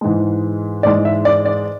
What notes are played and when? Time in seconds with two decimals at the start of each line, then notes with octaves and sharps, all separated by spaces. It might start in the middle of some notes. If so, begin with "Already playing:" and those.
0.01 G#2 E3 G#3
0.83 G#2 E3 G#3 D5
1.05 E5
1.25 D5
1.45 D5